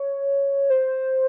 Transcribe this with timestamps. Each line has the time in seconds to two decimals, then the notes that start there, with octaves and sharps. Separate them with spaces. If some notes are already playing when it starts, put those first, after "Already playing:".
Already playing: C#5
0.70 C5